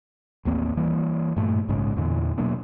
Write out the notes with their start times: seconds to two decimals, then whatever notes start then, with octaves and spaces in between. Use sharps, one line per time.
0.45 A1 D#2 A#3 C4
0.77 E3 G3 A#3
1.36 G2 A#2 A3
1.69 A#1 G#2 C#3 G#3
1.96 E2 A#2 D3 E3
2.38 B2 F#3 A#3 D4